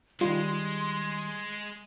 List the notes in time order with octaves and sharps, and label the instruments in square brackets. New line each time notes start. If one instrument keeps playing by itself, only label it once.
[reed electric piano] D#3 G3 [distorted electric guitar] G#3 [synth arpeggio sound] F4 [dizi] C6